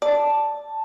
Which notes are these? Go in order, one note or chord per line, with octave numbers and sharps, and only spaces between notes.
D5 A5